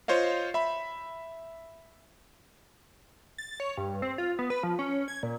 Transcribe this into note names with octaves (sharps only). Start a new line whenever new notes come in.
F4 C5 C#5 D#5 F5
E5 B5
A6
C#5
G2
C4
F4
B3
B4
F3
C#4
G#6
A#2